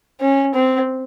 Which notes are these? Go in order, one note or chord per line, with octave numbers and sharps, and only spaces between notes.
C#4
C4